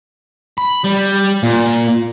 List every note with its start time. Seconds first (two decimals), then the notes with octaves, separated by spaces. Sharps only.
0.58 B5
0.85 G3
1.43 A#2